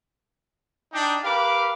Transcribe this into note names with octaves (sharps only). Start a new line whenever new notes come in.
D4 D#4 G5
G4 A#4 B4 F5 B5 D6